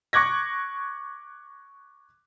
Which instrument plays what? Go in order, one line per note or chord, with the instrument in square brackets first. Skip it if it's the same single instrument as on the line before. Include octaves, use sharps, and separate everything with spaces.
[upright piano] C#6 D6 F#6 G#6 A#6